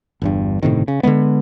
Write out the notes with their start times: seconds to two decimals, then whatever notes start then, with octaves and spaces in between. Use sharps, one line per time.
0.22 G1 E2 G2
0.63 G1 A2 C3 D#3
0.88 C#3
1.03 D3 F3 G#3 B3